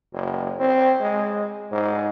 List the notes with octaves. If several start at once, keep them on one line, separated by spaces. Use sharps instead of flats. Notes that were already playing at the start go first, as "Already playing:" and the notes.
F#1
C4
G#3
G#2